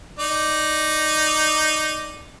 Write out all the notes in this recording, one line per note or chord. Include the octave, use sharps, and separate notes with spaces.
D#4 D5